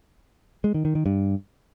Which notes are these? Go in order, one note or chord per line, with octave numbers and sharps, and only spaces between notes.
G#3
D#3
D#3
D#3
G2